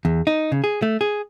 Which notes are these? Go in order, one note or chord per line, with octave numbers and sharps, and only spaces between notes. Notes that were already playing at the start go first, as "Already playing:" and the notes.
E2
D#4
C#3
G#4
A3
G#4